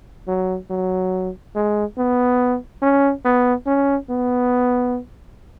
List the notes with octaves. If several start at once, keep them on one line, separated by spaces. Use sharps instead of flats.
F#3
F#3
G#3
B3
C#4
B3
C#4
B3